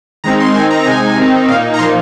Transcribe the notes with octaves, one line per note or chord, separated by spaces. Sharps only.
D#3 G#3 C4 D#4 A#5
C6
D#3 C4 D#4 G#5
A#5
C3 G#3 D#4 G#5
D#3 C4 D#4
A#2 A#3 D#4 F5
A#5
A#2 F3 A#3 D#4 C6